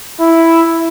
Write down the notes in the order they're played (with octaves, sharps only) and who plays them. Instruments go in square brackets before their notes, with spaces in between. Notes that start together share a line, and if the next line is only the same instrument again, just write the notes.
[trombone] E4